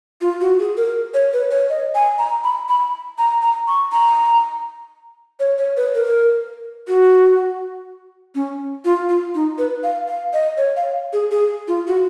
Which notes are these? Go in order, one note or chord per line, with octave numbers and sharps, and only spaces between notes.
F4
F#4
G#4
A#4
C#5
B4
C#5
D#5
G#5
A#5
B5
B5
A#5
A#5
C#6
A#5
C#5
C#5
B4
A#4
F#4
C#4
F4
F4
D#4
B4
F5
F5
D#5
C#5
F5
G#4
G#4
F4
F#4